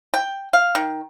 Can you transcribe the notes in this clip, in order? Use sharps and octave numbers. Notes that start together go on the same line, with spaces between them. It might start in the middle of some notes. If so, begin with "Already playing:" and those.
G5
F5
D#3